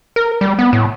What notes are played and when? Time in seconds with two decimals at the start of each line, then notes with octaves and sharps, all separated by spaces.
0.16 A#4
0.41 G3
0.59 B3
0.73 A2